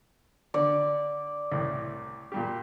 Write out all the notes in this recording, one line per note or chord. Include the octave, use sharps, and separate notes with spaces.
D3 D5
C2 A2
A#2 G3 G4